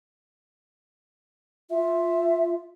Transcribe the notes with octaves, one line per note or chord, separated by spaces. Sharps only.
F4 E5